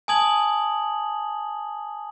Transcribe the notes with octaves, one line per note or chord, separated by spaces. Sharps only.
G#5 A5 D#6 G#6 F#7